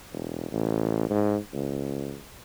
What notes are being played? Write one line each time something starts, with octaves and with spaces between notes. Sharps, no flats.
E1
A1
G#2
C#2